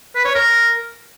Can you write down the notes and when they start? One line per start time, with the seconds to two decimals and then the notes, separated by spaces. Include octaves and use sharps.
0.15 B4
0.25 C#5
0.35 A#4